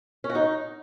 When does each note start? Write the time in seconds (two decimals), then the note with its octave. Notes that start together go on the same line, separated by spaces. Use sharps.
0.24 C#4
0.29 F#4
0.35 D#4